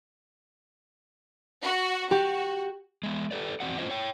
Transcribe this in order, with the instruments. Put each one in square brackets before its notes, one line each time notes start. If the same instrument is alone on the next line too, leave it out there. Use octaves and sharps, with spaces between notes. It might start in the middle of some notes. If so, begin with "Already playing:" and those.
[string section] F#4
[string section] F#4 [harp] G4
[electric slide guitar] G#3 B3
G4 A4 B4 D5
E2 G#2 C4 F#4 D5 F#5
A2 B3 C#4 F4 C5 D#5
C#5 G5